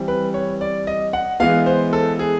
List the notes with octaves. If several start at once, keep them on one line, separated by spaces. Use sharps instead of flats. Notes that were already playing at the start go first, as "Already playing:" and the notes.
Already playing: E3 G3 C4
B4
C#5
D5
D#5
F#5
E3 G#3 B3 F5
C5
A4
G#4